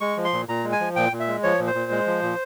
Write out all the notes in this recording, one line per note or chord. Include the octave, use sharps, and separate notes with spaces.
G#3 C#6
F3
C6
A#2
A#2 A#5
G#3
G#5
F3
A#2 G5
A#2
E5
G#3
F3 C#5
A#2
C5
A#2
G#3
F3
A#2